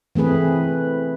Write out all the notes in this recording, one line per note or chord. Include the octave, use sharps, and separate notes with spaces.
E3 A3 C4 G#4 B4